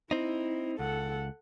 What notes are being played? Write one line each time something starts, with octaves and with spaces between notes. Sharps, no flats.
C4 D#4 E4
C#2 A4 F#5